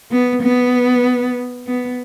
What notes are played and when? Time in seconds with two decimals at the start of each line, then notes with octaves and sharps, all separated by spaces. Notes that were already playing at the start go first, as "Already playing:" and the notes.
0.12 B3
0.43 B3
1.67 B3